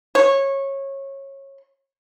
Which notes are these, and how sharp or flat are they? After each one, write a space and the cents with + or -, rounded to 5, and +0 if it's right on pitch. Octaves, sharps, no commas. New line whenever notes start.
C#5 -20